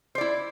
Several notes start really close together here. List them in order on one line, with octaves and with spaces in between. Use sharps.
C5 D5 E4